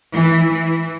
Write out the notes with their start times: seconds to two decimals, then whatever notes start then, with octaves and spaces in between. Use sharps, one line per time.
0.13 E3
0.50 E3